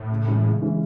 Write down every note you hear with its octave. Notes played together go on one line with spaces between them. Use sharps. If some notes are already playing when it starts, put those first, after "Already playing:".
Already playing: A2
C#3
E3 G#3 C#4
C#3
E3 G#3 C#4